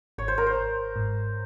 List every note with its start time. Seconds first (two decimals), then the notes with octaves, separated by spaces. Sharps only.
0.18 G#1 C#5
0.28 C5
0.38 A#4
0.46 C5
0.57 G#1
0.96 G#2